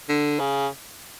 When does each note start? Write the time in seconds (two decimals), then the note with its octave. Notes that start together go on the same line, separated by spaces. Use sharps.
0.09 D3
0.40 C#3